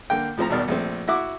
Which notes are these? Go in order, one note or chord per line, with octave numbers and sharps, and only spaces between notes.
D3 A#3 G5
A2 F3 C4 A#5
G#1 E2 B2 D#3 D5 F6
A#1 A3 C4
E4 F#4 E5 F#5 D6